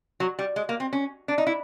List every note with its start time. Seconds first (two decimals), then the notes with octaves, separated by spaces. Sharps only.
0.20 F#3
0.39 G3
0.56 G#3
0.69 A#3
0.80 C4
0.93 C#4
1.28 D4
1.38 D#4
1.47 E4